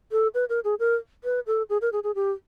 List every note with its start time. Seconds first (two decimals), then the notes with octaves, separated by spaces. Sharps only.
0.12 A4
0.34 B4
0.49 A#4
0.64 G#4
0.79 A#4
1.24 B4
1.47 A4
1.70 G#4
1.82 A#4
1.92 G#4
2.04 G#4
2.15 G4